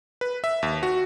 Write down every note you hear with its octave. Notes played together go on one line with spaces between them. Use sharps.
B4
E5
D#2
F#4